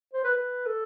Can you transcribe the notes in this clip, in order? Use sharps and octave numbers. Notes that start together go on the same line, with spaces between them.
C5
B4
B4
A4